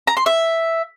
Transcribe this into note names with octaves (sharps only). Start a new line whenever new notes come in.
A#5
C6
E5